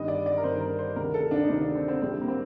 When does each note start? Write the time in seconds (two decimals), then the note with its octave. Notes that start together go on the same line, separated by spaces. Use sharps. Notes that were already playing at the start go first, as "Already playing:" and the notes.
Already playing: G1 G2 D#3 D#5
0.08 D5
0.26 D5
0.37 A#4
0.43 G1 G2 D#3 C5
0.61 A#4
0.79 C5
0.96 D2 C3 D#3 A#4
1.14 A4
1.31 D4
1.44 D#4
1.49 D2 C3 D#3 D4
1.62 D4
1.75 C4
1.88 C4
2.02 A#1 A2 G3 C4
2.21 A#3
2.28 C4